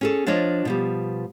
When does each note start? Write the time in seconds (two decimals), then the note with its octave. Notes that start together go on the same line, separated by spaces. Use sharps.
0.01 C#4 G#4 A4
0.27 F3 D4 F4 C#5 D#5
0.65 B2 F3 G3